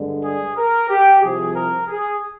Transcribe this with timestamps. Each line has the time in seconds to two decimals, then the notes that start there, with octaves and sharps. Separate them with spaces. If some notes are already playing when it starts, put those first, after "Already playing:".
Already playing: G2 D3 G#3
0.23 G#4
0.57 A#4
0.89 G4
1.22 C2 C3 F3 G#4
1.55 A#4
1.88 G#4